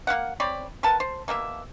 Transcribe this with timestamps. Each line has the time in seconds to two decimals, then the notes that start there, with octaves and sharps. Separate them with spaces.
0.07 A#3 E4 F5 F#5
0.40 C4 C#5 D5 B5
0.83 A#4 B4 F#5 A5
1.00 C5
1.28 B2 A#3 D4 E5